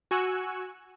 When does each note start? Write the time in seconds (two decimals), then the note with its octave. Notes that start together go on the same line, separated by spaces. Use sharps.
0.11 F#4 G#5 C#6 E6 F#6